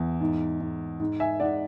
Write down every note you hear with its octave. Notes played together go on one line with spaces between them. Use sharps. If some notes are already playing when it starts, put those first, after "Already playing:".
Already playing: E2
G#2
G#2
G#2
E5 G#5
G#2 D5 F#5